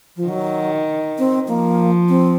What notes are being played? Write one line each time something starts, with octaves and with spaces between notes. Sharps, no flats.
F3
D#3 F#3
C4
F3 A#3
C4